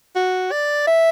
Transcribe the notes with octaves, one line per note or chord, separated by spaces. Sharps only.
F#4
D5
E5